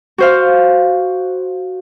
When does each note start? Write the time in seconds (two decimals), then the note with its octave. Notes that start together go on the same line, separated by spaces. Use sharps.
0.18 F#4 C5 F5